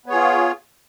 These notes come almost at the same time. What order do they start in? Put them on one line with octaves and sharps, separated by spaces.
B3 C#5 G#4 F4